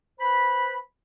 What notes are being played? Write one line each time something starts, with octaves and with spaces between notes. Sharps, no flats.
B4 C5 B5